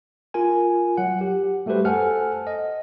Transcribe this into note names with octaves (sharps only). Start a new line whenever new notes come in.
F4 A#4 G#5
F#3 F#5
G4
G3 A3 F#4 G4 B4 C5
A4 C5 F#5 G#5 A5 F6
D#5